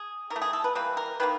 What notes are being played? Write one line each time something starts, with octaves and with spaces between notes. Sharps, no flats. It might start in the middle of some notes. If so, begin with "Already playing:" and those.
Already playing: G#4
E3 A#4
A3
G#4
A4
B4
E3 G3 A#3 B4
A#4
D#3 G3 A#3 B4